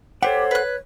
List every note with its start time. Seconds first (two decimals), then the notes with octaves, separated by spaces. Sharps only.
0.23 G4 A4 C5 C#5 F#5
0.51 B4 F#6